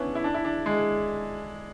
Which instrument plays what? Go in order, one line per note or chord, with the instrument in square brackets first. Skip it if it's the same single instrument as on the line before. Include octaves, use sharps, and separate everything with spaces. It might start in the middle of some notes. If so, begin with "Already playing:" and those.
Already playing: [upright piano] B3 C#4 D4 E4
E4
D4
E4
D4
G#3